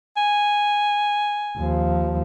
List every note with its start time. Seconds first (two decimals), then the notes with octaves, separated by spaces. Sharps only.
0.17 G#5
1.57 D#2 F3